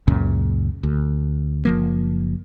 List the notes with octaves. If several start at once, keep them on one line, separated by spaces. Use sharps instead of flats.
C#2 F#2 A#2 C#3
D2
F#1 F3 A#3